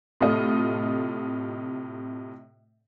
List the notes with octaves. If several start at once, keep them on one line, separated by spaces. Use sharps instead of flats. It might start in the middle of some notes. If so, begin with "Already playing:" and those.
A2 C3 F4 A4 D#5